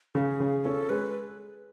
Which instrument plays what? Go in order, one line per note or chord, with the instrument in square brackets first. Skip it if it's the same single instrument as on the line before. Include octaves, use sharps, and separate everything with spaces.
[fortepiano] C#3 [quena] G#4 A4
[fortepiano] C#3
[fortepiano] C#4 [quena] A4
[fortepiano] G#3 [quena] B4